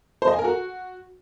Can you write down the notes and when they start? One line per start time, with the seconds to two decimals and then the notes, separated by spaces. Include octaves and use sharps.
0.22 C5
0.28 D#5
0.33 G#5
0.39 A#4
0.44 F#4